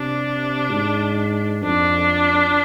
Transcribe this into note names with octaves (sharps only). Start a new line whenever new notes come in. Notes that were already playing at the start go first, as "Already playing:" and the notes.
Already playing: C3 D4
G#2
F2 D4